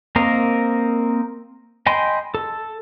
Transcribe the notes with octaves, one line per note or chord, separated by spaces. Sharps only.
A#3 C4 A#4 D#5 F5
D#5 G5 G#5 B5 C6
A4